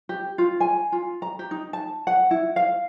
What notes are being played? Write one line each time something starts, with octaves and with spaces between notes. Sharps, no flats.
G4
F4
G#5
F4
A#5
G4
D#4
A5
F#5
E4
F5